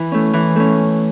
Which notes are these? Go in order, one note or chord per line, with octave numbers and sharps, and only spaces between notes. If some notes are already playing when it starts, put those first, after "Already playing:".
Already playing: E3
A3 C#4
E3
A3 C#4